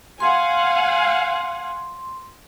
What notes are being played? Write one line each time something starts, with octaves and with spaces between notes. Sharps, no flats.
F5 F#5 G#5 C6